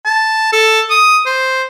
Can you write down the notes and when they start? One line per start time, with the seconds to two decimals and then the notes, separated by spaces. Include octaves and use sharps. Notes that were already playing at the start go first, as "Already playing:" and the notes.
0.05 A5
0.52 A4
0.90 D#6
1.26 C5